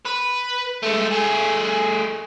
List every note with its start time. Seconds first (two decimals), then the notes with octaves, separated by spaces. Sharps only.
0.05 B4
0.83 G#3 A3
1.11 A3 G#4